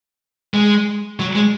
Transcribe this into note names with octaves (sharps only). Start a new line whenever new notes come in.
G#3
F#3
G#3